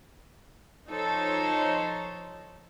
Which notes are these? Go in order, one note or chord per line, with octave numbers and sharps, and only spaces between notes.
F3 D#4 A4 C5 C#5